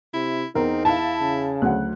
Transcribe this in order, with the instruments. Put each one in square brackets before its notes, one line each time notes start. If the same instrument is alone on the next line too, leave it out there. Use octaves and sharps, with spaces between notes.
[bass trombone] C3 [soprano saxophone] E4
[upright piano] E2 [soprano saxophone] C4 [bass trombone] D#4 [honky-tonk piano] A#4
[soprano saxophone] E4 [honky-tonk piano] F5 A5
[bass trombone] C#3
[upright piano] D2 F#3 F#5 [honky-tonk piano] F#6